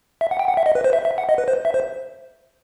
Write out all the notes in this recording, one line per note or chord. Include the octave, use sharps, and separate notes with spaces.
E5
F#5
G5
F#5
E5
D#5
B4
C5
E5
E5
F#5
D#5
B4
C5
E5
C5